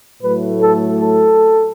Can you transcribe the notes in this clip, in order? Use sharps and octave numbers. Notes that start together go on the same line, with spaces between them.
A2 F#3 A3 B4
A4
A4